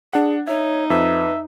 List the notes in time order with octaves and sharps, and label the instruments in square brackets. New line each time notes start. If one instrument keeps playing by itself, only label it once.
[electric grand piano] D4 F#5 [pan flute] G#4
[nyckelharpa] D#4 [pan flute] C#5 [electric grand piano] E5
[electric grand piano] F2 [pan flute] B4 [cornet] E5